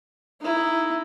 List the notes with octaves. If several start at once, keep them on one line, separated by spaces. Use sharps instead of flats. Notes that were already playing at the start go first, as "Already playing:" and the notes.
D#4 E4